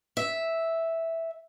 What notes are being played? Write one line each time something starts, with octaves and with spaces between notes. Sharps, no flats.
E5